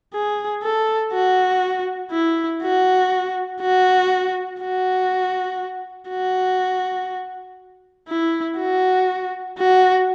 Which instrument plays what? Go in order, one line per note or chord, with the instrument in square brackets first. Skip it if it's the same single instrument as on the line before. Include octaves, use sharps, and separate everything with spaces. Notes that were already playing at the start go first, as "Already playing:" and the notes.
[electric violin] G#4
A4
F#4
E4
F#4
F#4
F#4
F#4
E4
F#4
F#4